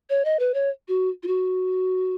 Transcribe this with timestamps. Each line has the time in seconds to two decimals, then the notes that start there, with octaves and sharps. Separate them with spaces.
0.10 C#5
0.25 D#5
0.39 B4
0.54 C#5
0.88 F#4
1.23 F4
1.27 F#4